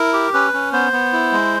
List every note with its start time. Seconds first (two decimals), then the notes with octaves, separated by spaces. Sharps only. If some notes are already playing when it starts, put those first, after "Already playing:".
Already playing: E4 A#4
0.13 G4
0.34 C#4 B4
0.53 C#4
0.73 B3 C5
0.93 B3
1.13 E4
1.32 G#3